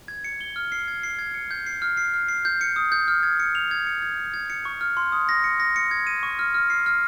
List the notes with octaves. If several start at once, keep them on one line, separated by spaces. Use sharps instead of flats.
G#6
C#7
G7
F6
C7
G#6
C7
G#6
C#7
G6
C7
F6
C7
F6
C7
G6
C#7
D#6
G6
F6
G#6
C#7
F7
G#6
C#7
G#6
C#7
G#6
C#7
C#6
F6
C6
D#6
A#6
C#7
A#6
C#7
G#6
D#7
C#6
F6
F6
C7
F6